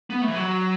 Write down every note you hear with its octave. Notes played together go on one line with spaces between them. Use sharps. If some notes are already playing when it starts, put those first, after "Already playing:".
B3
A3
E3
F#3